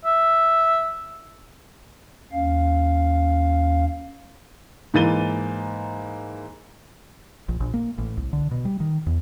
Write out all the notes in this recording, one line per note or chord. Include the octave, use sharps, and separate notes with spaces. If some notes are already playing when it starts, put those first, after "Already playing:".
E5
D#2 C#4 F5
G#2 E3 A#3 A6 D#7 G7
A#1
A#1
A#3
A1
C2
D3
B2
G3
D#3
E2